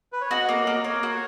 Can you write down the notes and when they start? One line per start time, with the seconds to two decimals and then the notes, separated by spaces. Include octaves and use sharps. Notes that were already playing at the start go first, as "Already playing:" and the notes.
0.13 B4
0.21 C#5
0.31 F#4 D#5
0.49 A#3
0.67 A#3
0.84 A#3 C#5
1.03 F#4